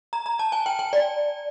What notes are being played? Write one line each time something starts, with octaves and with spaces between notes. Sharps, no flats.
A#5
A#5
A5
G#5
G5
G5
D5